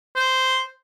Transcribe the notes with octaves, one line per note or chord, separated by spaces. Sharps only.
C5